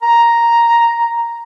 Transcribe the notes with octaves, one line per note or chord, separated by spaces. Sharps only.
A#5